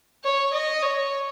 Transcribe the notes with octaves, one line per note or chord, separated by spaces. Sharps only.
C#5
D#5
C#5